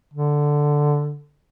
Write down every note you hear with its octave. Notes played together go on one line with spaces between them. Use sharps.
D3